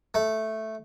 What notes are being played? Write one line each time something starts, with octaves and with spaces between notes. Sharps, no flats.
A3